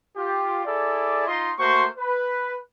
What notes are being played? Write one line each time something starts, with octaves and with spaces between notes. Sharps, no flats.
F4 G4
E4 G#4 A4 D5
D#4 F4 D#5 C6
A3 A#3 F#4 C5 C6 C#6
B4